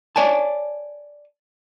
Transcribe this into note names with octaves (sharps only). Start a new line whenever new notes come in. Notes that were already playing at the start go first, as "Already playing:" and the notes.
C#5 D5 G#5 A5